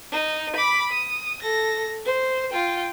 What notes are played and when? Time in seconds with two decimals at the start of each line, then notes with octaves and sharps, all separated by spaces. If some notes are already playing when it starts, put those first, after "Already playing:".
0.12 D#4
0.56 B5 D6
0.92 D#6
1.42 A4 A#6
2.05 C5
2.51 F4 G5